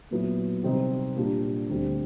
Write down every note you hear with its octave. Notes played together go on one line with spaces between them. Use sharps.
A#2 F#3 B3 E4
C3 D#3 G3 C4 D#4
A#2 G3 A#3 D4 G4
D2 D3 G3 C4